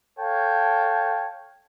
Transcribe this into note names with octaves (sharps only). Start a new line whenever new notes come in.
A4 C#5 F5 G5 A5